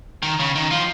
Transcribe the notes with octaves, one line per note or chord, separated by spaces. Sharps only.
D#3
C#3
D#3
F3